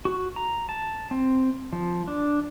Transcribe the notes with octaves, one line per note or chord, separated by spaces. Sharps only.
F#4
A#5
A5
C4
F3
D4